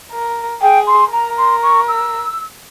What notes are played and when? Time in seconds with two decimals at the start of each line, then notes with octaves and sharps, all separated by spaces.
0.11 A#4
0.61 G#4 G5
0.87 C6
1.12 A#4 A#5
1.38 C6
1.63 C#6
1.88 E6